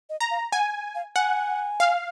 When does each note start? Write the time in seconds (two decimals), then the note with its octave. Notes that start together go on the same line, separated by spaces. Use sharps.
0.10 D#5
0.20 A#5
0.31 F5
0.52 F#5 G#5
0.95 F5
1.16 F#5 G#5
1.80 F5